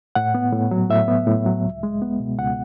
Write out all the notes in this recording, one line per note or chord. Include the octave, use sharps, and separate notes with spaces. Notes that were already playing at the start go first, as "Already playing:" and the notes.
A2 F#5
B3
A2
F#3
A2 E5
B3
A2
F#3
C#2
G#3
B3
B2
C#2 F#5